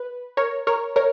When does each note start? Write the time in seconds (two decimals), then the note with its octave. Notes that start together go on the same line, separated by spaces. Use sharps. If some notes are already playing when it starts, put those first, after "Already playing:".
Already playing: B4
0.37 A#4 C#5
0.67 A#4 C#5
0.96 A#4 C#5